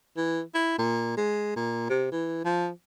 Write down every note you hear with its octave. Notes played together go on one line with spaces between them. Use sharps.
E3
E4
A#2
G#3
A#2
C3
E3
F3